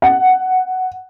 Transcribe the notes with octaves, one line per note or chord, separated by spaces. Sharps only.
F#5